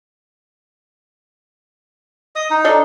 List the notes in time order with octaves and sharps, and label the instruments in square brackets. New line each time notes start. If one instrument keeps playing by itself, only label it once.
[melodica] D#5 D#6
D#4
[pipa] D4 A4 D#5